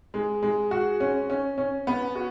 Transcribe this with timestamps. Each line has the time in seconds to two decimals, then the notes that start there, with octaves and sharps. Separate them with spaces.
0.14 G#3
0.43 G#3
0.71 F#4
1.00 C#4
1.30 C#4
1.58 C#4
1.87 B3
2.15 F#4